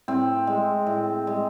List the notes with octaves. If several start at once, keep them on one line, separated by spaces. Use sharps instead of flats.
A2 C4
G#3
A2
G#3